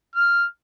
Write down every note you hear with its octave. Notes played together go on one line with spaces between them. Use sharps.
F6